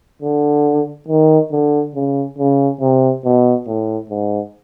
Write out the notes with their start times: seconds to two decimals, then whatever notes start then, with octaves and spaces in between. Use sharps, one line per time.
0.22 D3
1.09 D#3
1.52 D3
1.95 C#3
2.39 C#3
2.81 C3
3.24 B2
3.68 A2
4.10 G#2